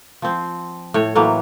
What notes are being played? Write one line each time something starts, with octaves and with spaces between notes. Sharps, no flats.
F3 C4
A2 C#5
A2 E3 F#3 A#3